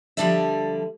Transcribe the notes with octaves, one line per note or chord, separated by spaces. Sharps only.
D3 F3 G3 D4 D5 E5